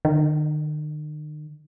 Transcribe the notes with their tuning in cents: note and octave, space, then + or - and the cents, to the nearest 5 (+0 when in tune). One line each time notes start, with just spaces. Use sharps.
D#3 -45